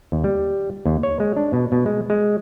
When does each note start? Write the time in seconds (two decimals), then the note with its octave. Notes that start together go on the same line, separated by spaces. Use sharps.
0.12 D#2
0.24 G3
0.86 D#2
1.03 C#5
1.20 G#3
1.37 D4
1.53 B2
1.72 B2
1.86 G#3
2.10 G#3